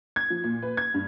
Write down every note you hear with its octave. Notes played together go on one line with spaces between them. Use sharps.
G#6
F3
A#2
B4
G#6
G2